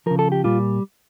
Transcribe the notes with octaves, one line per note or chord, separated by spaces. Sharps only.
C#3 F3 A#4
A4
G4
A#2 G3 F4